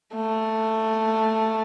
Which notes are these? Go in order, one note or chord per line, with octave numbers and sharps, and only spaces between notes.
A3